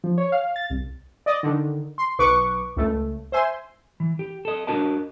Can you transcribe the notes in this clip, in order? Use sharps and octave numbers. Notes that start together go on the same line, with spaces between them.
F3
C#5
F5
A6
C2
D5 D#5
D3 D#3
C6
B1 B4 C#6 D6
C#2 A3
C5 E5 G#5 C6
E3
G4
A4 D#5
D4 F#4 A#4 D#5 A5